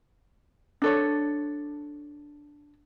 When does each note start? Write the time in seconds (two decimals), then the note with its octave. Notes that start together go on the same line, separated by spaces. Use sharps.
0.82 D4 A4 C#5